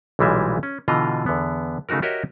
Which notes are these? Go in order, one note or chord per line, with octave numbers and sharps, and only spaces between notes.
B1 A#2 E3 G3 G#3 E5
C#4
B2 D3 E3 F4 D#5 A#5
E2 D3 B3
C#3 A3 D#4 F#4 A#4
F#4 G4 A#4 C#5 D#5 E5